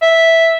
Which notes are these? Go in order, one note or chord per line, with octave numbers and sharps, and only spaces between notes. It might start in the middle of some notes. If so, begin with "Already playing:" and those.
E5